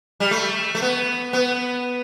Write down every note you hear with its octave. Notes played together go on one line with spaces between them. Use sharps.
G3
A3
A3
B3
B3